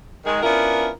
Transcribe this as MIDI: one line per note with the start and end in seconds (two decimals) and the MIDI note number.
0.25 0.41 51
0.25 0.41 56
0.42 0.89 59
0.42 0.89 61
0.42 0.89 62
0.42 0.89 64
0.42 0.89 65
0.42 0.89 70